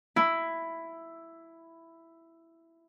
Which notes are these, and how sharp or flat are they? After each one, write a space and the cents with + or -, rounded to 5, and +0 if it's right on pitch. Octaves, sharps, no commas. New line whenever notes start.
E4 +5